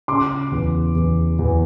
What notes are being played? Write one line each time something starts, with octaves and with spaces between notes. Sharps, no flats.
C#3 C6 D6
E2
E2
E2